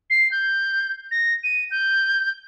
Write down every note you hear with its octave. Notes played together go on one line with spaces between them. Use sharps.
C7
G6
A#6
D#7
G6